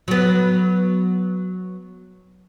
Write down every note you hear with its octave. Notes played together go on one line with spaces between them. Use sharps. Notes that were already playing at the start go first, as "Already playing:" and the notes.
F#3 B3